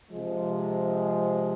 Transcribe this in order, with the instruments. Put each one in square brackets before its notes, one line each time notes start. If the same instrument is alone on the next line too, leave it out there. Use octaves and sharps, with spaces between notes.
[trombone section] C3 F3 G#3